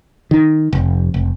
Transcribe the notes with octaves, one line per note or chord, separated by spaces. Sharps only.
D#3
F1
F1